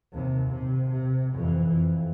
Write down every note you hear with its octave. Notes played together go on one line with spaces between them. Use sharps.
D#2 C3
C3
C3
F2 E3
F2